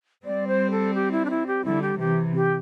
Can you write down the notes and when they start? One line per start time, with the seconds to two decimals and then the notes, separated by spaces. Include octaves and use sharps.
0.24 G3 C4 D5
0.47 C5
0.71 A4
0.94 G4
1.11 E4
1.25 D4
1.30 E4
1.47 G4
1.64 D3 G3 E4
1.82 G4
1.99 C3 E3 G4
2.35 G4